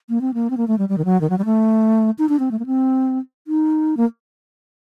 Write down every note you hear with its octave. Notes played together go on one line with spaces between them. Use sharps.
A#3
C4
A#3
C4
A#3
A3
G3
G3
D#3
F#3
D#3
F#3
G3
A3
D#4
D4
C4
A3
A#3
C4
D#4
A#3